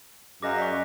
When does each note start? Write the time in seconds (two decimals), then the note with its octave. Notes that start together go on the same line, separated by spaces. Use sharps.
0.42 F#2 G#4 D#5 F5 D6 A#6
0.58 D5 D#5 C#6 B6